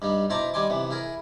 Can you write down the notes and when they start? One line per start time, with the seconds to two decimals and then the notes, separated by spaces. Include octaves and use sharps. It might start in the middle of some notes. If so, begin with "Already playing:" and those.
0.02 G2 G3 D#4
0.30 B2 E4 C5 A5 A#5 D6
0.54 G3 D#4 G#5 C6 D6
0.70 C3 E3 B3
0.91 E4 G#4 A#4